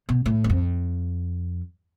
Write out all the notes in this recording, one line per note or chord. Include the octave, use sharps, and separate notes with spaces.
B2
A2
E2
F2